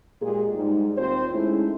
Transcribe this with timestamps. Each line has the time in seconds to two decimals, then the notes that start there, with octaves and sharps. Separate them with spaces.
0.22 A#2 G#3 F4 G4 G#4
0.54 G#2 G3 G#3 D#4
0.98 D#2 C4 F4 C5
1.34 G#3 A3 C#4 D#4 E4